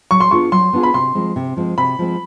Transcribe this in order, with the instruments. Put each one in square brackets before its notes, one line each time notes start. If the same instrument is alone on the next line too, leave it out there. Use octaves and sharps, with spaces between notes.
[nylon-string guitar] F#3 [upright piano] C#6
[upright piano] C6
[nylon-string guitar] B3 D4 F4 G#4 [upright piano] C#6
[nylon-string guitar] F#3 [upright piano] C6
[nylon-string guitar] B3 D4 F4 G#4
[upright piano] B5
[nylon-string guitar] C3 [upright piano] C6
[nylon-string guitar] F3 G#3 C4
C3
F3 G#3 C4
[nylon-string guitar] C3 [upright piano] B5
[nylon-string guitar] F3 G#3 C4